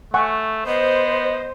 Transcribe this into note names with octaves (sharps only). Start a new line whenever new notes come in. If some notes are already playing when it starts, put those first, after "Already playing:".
A3 F#5 G#5 C#6
B3 C5 D#5